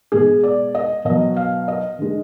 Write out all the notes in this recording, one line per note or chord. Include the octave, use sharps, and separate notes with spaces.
B2 G#3 G#4
D5
D#5
B2 F#3 D#5
F5
D#5
D3 G#3